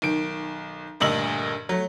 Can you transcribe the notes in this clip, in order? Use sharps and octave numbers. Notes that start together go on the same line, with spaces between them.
B1 D#3 D7
D2 G2 A#2 D#5 E6 F#7
F#3 A3